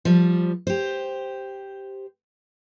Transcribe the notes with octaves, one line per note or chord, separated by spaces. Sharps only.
F3 G3
G4 C5